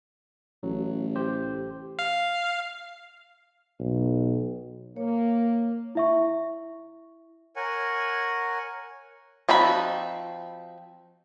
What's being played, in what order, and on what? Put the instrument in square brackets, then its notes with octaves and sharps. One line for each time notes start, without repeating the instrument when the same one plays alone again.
[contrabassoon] A1 [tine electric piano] F#3
[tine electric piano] G4 C5
[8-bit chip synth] F5
[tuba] B1
[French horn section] A#3 [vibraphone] C#5
[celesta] E4 E5 C#6
[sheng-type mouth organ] A#4 C#5 F#5 G#5
[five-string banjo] F3 C4 D#4 F#4 B5